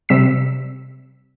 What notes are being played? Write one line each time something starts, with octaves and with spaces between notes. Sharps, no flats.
C3 G3 E6 B6